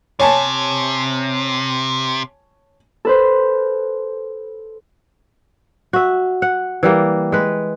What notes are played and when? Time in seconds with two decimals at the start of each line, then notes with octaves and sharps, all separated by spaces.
0.20 C3 C#5 G#5 A5
3.05 A4 B4 C5
5.93 F#4 E5
6.42 F#5
6.83 E3 G3 A#3
7.32 G#3 B4